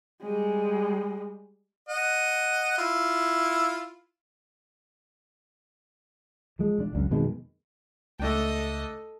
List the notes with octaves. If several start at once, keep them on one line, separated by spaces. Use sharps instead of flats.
G3 G#3
D#5 F#5
E4 F4
F3 G#3
E1 D4
C#2 F#2
F2 B2 D#3 G#3
C#2 A3 D4 A4 D#5 G5